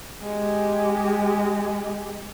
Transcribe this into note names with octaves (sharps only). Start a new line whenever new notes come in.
G#3 G4